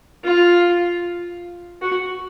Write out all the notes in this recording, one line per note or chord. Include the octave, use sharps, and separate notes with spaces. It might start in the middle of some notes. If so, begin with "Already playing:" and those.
F4
F#4